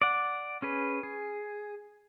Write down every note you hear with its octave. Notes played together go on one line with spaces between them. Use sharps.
D5 F#5
C#4 G#4 B4
G#4